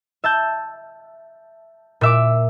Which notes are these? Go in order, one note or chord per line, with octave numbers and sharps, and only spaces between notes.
E5 A5 G6
A#2 E5 D6